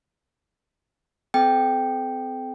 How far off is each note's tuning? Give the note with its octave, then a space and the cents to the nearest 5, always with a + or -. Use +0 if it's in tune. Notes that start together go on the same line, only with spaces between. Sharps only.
C4 -35 A4 -35 G5 +0